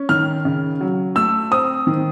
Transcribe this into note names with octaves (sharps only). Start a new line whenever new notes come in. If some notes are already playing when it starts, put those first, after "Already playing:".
Already playing: C#4
D#3 F6
C#3
F#3
A3 E6
C4 D#6
D#3